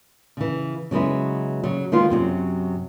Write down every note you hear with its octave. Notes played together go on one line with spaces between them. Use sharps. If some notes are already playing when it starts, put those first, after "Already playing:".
C#3 E3
C#3 F#3 G#3 B3 E4
C#3 F#3
D#3 G#3 B3 F4
F#2 C3 D#3 F#3